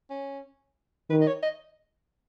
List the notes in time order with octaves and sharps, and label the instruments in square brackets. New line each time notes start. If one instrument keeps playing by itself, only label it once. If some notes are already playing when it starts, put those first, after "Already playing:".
[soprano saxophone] C#4
[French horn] D#3 [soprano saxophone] B4
[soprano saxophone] D#5
C#5
D#5